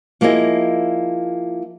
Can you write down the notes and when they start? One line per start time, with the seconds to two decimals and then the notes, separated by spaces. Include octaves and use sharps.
0.21 F3 A#3 E4 G#4 D#5 E5